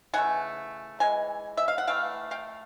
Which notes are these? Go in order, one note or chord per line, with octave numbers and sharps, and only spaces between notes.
C#3 E3 A3 F#5 G#5
E3 G#3 G#5
E5
F5
F#5
E3 A3 F5 G5
F5 G5